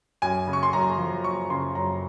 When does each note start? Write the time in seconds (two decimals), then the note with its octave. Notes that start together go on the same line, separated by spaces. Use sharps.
0.22 F#2 G#5
0.47 C#3
0.53 C#6
0.63 C6
0.73 F#2 A#5
0.98 F3
1.24 F#2 C#6
1.50 C#3 C6
1.75 F#2 A#5